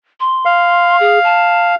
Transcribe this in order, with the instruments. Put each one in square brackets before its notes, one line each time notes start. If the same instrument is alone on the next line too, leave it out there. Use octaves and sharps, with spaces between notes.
[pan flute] C6
[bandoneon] F5
[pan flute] G#4
A5